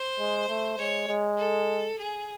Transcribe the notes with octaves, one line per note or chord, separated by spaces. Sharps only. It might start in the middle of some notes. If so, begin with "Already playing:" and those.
Already playing: C5
G#3
A3
G#3 C#5
G#3
A4
G#4